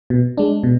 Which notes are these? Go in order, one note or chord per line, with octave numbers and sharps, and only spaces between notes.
B2
G#3 D4
B2